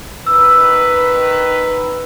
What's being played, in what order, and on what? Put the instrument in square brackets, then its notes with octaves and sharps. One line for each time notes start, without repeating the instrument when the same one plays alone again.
[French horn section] D#3 B4 [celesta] E6